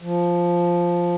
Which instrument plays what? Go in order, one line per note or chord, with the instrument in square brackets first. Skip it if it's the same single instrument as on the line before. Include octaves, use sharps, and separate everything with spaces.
[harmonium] F3